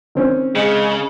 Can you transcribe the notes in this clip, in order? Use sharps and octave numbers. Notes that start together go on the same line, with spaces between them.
D#3 C4 C#4
C#3 G#3